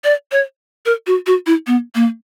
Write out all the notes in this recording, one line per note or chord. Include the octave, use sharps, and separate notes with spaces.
D5
C#5
A#4
F#4
F#4
E4
B3
A#3